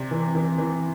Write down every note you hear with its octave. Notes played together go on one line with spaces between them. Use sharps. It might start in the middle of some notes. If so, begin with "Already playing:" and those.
Already playing: C3 D5
E3
E3
E3